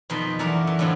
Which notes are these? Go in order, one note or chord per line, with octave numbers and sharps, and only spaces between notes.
F2 B2 D#3 D#4 B4 C6
F#2 E3 A3 A#4 D5 A#5
E3
A2 D3 F#3 C4 F4